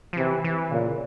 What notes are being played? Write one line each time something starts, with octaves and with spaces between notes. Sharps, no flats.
F3
C3 E3
E3
A#2 C#3